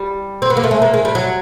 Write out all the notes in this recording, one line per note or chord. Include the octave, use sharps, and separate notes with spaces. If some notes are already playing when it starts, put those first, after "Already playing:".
Already playing: G3
C4
B3
A#3
A3
G#3
A#3
G#3
G3
F#3